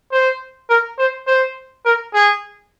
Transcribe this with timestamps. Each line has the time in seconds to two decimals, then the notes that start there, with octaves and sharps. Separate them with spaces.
0.12 C5
0.70 A#4
0.98 C5
1.27 C5
1.85 A#4
2.14 G#4